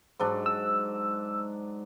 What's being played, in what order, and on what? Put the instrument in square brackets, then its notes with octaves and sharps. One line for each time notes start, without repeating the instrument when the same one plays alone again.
[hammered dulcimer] G#2 F#3 D4
[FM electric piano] E6